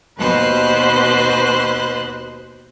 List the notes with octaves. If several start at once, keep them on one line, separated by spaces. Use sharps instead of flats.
D#2 B2 B4 C5 F#6